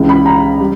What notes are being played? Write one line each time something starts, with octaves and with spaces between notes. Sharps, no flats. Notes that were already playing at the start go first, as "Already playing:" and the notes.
Already playing: C#2 C#3 E3
B5
A#5
G3